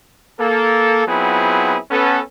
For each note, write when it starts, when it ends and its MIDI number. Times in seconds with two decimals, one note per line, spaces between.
0.40 1.04 58
0.40 1.04 69
1.07 1.77 54
1.07 1.77 59
1.07 1.77 60
1.07 1.77 64
1.07 1.77 65
1.07 1.77 68
1.90 2.19 59
1.90 2.19 61
1.90 2.19 69